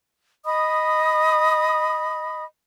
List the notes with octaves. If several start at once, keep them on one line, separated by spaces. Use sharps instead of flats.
D#5 B5 D#6